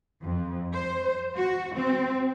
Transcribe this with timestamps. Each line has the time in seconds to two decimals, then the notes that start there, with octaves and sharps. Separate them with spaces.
0.23 F2
0.74 C5
1.36 F#4
1.75 C4